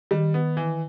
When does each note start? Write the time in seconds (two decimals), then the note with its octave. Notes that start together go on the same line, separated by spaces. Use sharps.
0.11 D#3 G3
0.34 B3
0.57 E3